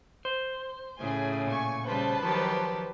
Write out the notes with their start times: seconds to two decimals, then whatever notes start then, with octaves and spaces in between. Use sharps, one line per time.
0.25 C5
1.00 A2 C#3 A3 G#4 G#5
1.47 A#2 G#5 C#6
1.86 C#3 G3 B4 C5 A5
2.22 D#3 F3 F#3 G4